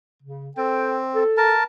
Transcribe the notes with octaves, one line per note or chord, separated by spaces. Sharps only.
C#3
C4 A4 G5
A4
A#4 A5